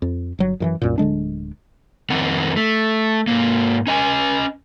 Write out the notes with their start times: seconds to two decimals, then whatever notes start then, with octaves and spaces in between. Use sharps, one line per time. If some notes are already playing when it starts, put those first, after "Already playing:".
0.02 F2
0.39 G1 F#3
0.60 F#2 D#3 E3
0.82 C2 F#2 A#2
0.98 D1 D3 G#3 D4
2.10 F2 D#3 C4 F#5
2.56 A3
3.27 G#2 A#3
3.87 C#4 D#5 G#5